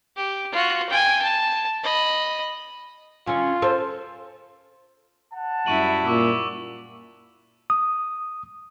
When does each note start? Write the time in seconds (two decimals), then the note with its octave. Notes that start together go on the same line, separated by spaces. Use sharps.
0.16 G4
0.52 F4 F#4
0.89 G5 G#5
1.22 A5
1.83 D#5 B5
3.27 D3 C#4 F4
3.62 A4 C5
5.33 F#5 A5
5.66 F#2 G3 E4 C#6 D#7 F#7
6.05 A#2 C#6 D6 E6
7.70 D#6